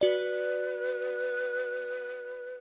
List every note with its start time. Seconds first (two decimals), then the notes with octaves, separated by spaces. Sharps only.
0.01 F#4 B4 D5